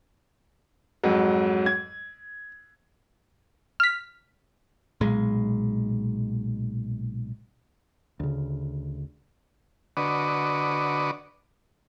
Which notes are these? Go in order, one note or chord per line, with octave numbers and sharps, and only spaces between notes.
F2 G#2 F#3
G#6
F6 B6
B1 A#2 G#3
D2 C#3
D3 F#4 B4 D5 D#5 C#6